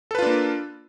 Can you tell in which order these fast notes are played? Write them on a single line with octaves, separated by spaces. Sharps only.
A4 B4 F4 D4 A#3